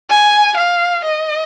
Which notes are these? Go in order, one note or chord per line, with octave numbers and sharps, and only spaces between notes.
G#5
F5
D#5